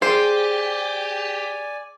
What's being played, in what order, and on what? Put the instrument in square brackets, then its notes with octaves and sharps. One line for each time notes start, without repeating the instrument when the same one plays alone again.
[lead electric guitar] G4 [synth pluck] G#4 [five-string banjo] C5 [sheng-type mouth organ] D5 G#5